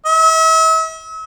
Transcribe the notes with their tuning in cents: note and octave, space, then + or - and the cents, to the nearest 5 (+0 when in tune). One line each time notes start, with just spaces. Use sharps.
E5 -40